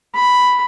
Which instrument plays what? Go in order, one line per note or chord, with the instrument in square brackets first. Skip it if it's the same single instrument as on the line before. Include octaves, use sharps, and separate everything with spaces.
[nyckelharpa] B5